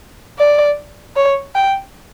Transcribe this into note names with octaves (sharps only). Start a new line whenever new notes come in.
D5
C#5
G5